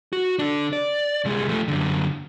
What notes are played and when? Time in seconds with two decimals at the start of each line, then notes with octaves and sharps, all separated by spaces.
0.13 F#4
0.39 D3 D4
0.73 D5
1.25 C2 G#3
1.49 F3 A3
1.68 F#2 D3